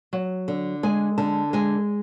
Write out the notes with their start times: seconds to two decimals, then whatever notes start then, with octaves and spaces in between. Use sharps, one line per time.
0.13 F#3
0.48 D3
0.83 G#3 G#5
1.18 D3 A5
1.53 G#3 G#5